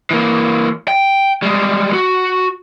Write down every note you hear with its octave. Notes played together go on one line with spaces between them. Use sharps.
E3 A#3
G5
G3 G#3
F#4